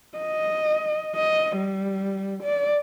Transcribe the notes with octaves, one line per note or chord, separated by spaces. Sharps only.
D#5
D#5
G3
D5